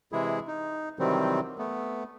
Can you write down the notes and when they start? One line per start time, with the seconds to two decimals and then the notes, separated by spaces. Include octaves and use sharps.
0.12 C3 E3 G#3 E4 G#4
0.48 D#4
0.99 C3 D#3 E3 F#3 G3 C4
1.58 A3 B3